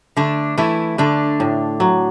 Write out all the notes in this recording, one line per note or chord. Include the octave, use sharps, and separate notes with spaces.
D3 A3 D4
E3 A3 E4
D3 A3 D4
A2
F#3